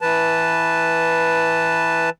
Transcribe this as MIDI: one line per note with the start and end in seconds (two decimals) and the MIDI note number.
0.01 2.10 52
0.01 2.10 71
0.01 2.10 81